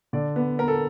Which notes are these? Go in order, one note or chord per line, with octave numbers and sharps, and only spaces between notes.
D3 D5
B3
B3 A#4
A4